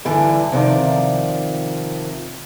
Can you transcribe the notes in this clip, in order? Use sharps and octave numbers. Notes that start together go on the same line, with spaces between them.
G2 D3 E3
C3 D#3 F3 D5